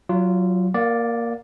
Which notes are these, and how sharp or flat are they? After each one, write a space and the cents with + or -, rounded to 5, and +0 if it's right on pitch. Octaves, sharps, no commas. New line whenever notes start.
F#3 +0 F4 -15 C#5 +45
A#3 +0 D5 +0 F#5 -45